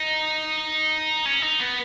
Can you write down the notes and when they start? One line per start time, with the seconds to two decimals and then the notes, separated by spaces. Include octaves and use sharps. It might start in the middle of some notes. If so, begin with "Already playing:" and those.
Already playing: D#4
1.26 C#4
1.42 D#4
1.60 B3